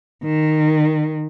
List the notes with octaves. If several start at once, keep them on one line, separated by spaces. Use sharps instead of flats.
D#3